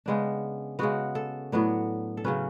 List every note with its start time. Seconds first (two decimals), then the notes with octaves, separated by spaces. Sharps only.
0.06 C#3 G#3 B3 D4
0.79 C#3 G#3 B3 F#4
1.15 A4
1.52 A2 F#3 B3 D4
2.17 A4
2.24 C#3 F#3 C#4 B4